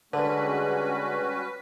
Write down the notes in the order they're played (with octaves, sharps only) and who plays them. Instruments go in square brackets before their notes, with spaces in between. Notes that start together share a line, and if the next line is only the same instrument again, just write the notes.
[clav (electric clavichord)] D3 [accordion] G3 C#4 F#4 [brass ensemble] G#3 [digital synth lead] B4